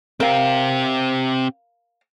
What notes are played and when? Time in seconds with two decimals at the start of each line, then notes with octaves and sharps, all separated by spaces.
0.20 C4 G4 A#4 F5